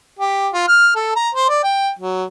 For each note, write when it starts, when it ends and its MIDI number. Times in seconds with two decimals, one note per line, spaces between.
0.19 0.48 67
0.53 0.64 65
0.68 0.91 89
0.95 1.15 69
1.16 1.29 82
1.35 1.48 72
1.49 1.59 74
1.63 1.90 79
1.99 2.24 54